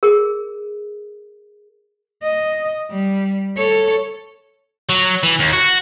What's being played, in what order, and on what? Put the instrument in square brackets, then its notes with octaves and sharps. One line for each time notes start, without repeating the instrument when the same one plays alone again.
[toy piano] G#4 A#4
[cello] D#5
G3
A4 C#5
[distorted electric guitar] F#3
E3
D#2
F#4